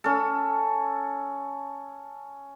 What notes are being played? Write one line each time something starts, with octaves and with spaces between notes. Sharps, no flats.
C#4 A4